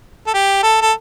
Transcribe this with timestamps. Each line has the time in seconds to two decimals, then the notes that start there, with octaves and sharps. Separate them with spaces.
0.27 A4
0.34 G4
0.63 A4
0.82 A4